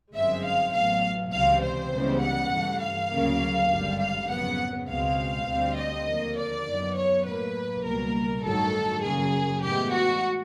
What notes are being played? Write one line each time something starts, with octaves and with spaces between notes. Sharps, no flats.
G1 F#2 D#3 G#3 C4 E5
F5
A1 A2 F#3 B3 F5
C#2 C3 E3 G3 C4 F5
C5
C#2 C#3 E3 G3 B3
F#5
G2 E3 A3
F5
D2 C#3 F#3 A#3
G#1 G2 D3 G3
F5
F2 C#3 F#3 B3 F#5
C#2 B2 G#3 C4 F5
D2 D3 G3 C4
D#5
D#2 D3 F3 A#3
D5
F#2 D#3 F#3 B3
C#5
A2 F#3 A#3 B4
C#2 B2 G3 A#3 A#4
A1 G2 D#3 F#3 A4
F#2 C#3 F#3 A#3 G#4
A2 E3 G#3 B3 G4
F#4